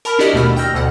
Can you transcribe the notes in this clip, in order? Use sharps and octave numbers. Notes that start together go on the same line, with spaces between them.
A#4 A5 B5 F6
D4 E4 F#4 G4 D5 D#5
D#2 B2 A3 B5 F6
G5 E6 F6 G6 A#6
D2 B2 F#5